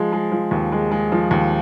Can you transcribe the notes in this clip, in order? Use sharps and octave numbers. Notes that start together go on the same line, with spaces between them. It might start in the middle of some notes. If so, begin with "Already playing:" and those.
Already playing: F3 G#3
G#3
F3
D#2
G#3
G#3
F3
D#2